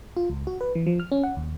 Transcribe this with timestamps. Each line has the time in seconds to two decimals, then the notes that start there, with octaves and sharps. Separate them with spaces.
0.17 F4
0.30 C#2
0.47 F#4
0.61 B4
0.75 E3
0.87 F3
1.00 F6
1.12 C#4
1.23 F#5
1.37 D#2